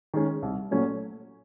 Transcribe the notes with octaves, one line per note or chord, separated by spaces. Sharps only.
D#3 G#3 C#4
C2
A#2 F#3 A3 C#4